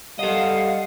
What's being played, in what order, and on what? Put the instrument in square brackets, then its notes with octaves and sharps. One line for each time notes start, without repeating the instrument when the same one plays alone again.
[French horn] G3 [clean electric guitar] A4 D#5 [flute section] F5 F#5